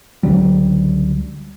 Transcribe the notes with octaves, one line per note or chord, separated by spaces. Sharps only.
C#2 D3 F#3 G3